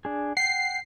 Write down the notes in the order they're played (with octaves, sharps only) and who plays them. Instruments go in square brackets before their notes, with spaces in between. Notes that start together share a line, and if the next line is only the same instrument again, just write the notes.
[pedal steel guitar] D4 G#4
[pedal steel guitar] F#5 G5 [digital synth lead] C7